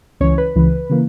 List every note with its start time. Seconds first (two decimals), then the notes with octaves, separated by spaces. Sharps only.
0.20 C#2 C#3 E3 C#4 C#5
0.38 B4
0.56 C#2 C#3 E3
0.90 C#3 E3 A#3